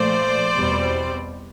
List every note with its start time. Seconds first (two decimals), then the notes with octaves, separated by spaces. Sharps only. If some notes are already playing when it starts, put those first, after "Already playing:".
Already playing: A#2 F3 A3 C5 D5
0.54 E2 B2 G3 C4